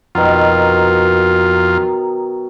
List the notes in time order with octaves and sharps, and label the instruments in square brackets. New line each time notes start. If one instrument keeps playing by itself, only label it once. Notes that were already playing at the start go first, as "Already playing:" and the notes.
[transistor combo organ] F2 F4 [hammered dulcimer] B2 D#3 F#3